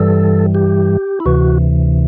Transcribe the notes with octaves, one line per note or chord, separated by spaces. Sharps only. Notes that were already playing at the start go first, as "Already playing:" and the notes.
Already playing: G2 E3 G3 A4
G4
E4
D2 C3 E3 F#4